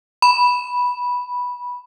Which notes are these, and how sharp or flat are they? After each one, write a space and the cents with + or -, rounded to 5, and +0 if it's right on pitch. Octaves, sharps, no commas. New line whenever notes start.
B5 -10